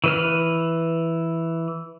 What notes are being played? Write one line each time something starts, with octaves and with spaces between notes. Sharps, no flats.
E3 B4 F6